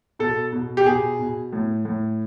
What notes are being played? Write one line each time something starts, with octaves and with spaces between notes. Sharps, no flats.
B2 A4
B2
G4
B2 G#4
B2
A2
A2